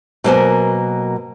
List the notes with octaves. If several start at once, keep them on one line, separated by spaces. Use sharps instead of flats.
B2 F#3 A#3 A#4 C5 G#5